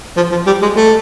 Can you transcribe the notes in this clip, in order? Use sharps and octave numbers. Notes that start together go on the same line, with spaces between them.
F3
F3
G3
G#3
A3